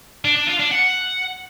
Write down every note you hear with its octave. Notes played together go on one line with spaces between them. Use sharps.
D4
D4
F4
D4
F#5